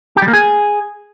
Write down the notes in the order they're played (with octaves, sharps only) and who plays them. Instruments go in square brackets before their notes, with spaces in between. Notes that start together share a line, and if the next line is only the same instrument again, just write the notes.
[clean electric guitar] G4
G3
A#3
G#4